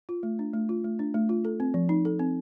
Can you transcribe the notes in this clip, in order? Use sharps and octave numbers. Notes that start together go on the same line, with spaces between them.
F4
A3
D4
A3
F4
A3
D4
A3
F4
A4
C4
F3
D#4
A4
C4